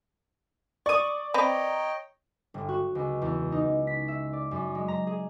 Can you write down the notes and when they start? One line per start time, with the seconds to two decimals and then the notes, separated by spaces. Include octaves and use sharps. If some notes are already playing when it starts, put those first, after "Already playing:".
0.86 D5 C#6 D#6
1.34 C4 B4 C#5 D#5 G5 A#5
2.54 G1
2.69 F#4
2.95 C#2
3.22 E2
3.52 D#4
3.87 B6
4.08 E5
4.33 D5
4.51 F#2
4.75 G#3
4.88 A#5
5.07 G#4